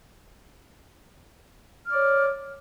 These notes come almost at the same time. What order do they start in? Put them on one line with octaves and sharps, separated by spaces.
F6 D5 C#5